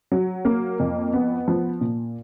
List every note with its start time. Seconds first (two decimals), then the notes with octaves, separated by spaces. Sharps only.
0.12 F#3
0.45 A#3
0.80 F2
1.13 B3
1.48 F3
1.81 A#2